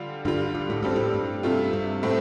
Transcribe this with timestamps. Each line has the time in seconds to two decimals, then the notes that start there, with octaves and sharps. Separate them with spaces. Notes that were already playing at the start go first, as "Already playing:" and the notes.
Already playing: D3 G3 F4
0.25 G2 D3 G3 F4
0.55 G2
0.70 A2
0.83 G2 G3 C4 A4
0.96 A2
1.14 G2
1.43 C3 A3 F4
1.73 G2
2.03 A2 A3 C4